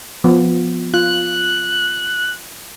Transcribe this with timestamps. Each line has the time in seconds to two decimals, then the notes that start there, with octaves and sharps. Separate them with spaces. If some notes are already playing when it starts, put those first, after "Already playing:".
0.24 F3 B3
0.94 F4 F#6